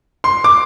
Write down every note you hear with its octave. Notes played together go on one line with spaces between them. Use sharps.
C6
D6